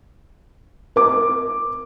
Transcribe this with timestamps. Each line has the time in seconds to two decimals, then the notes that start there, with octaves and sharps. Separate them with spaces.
0.96 A#4 D6